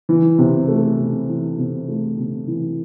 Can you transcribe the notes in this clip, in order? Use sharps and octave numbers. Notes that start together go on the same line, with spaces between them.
E3
C3
A3
C3
E3
C3
A3
C3
E3